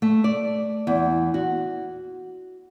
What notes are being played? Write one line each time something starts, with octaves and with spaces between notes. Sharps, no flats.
A3
D5
E2
F#4